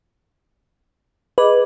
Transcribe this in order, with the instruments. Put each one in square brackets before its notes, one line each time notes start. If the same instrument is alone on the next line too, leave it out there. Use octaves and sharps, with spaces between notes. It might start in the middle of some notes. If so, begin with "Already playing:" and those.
[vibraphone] G#4 D#5 D6 [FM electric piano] B4